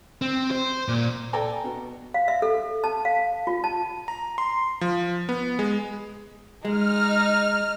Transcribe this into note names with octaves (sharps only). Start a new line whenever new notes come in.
C4
C5
A#2
A4 D5 G5 G#5 A#5
B2
F5
E5
A4
A5
F5
F4
A5
A#5
C6
F3
B3
G#3
G#3 D#4 F6